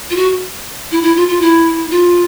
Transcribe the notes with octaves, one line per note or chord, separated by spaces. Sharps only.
F4
F#4
E4
E4
F4
F4
E4
F4